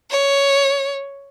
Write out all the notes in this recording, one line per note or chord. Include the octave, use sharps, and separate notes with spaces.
C#5